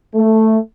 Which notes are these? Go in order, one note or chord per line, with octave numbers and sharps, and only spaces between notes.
A3